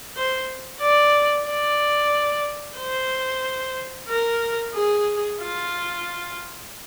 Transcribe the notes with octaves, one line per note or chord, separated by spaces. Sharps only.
C5
D5
D5
C5
A#4
G#4
F4